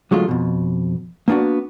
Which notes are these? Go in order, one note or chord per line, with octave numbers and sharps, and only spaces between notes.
D3 F#3 G#3 A3 F4
F2 B2
A#3 B3 D4 D#4 F#4